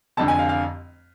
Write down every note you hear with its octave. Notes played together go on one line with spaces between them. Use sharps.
F1 F2 D3 A5
G#5
F5
F5